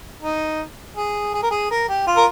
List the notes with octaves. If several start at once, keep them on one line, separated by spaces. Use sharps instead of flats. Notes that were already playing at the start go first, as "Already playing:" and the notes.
D#4
G#4
G#4
A#4
G#4
A#4
G4
F4
A#4